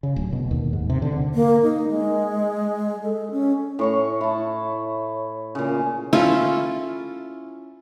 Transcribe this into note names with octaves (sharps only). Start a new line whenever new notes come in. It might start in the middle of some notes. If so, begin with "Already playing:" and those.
C#3
D1
B2
D#2
G#2
C3
D3
A#3
D#4
G#3
A4
C#4
A2 C#5 C#6
E4 A5
A#2 C#3
C#4 E4 F4 A4